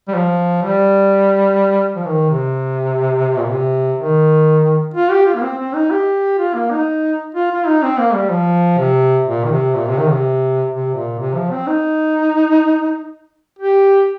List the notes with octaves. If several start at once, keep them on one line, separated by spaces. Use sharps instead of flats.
G3
F3
G3
F3
D#3
C3
A#2
C3
D#3
F4
G4
F4
A#3
C4
C4
D#4
G4
F4
A#3
D#4
F4
F4
D#4
C4
A#3
G3
F3
C3
A#2
D#3
C3
A#2
C3
D#3
C3
C3
A#2
C3
F3
C4
D#4
G4